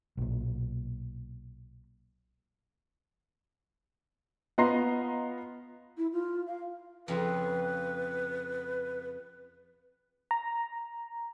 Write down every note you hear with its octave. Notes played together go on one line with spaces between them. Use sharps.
B1 A#2
B3 F4 D#5 A#5 C6 C7
E4
F4
F5
F2 C#3 F4 B4
A#5